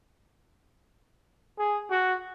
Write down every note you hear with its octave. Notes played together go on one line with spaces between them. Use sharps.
G#4
F#4